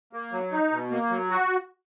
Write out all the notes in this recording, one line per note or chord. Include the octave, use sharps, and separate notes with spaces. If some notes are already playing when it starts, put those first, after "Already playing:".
A#3
F#3
D#4
B2
A#3
F#3
F#4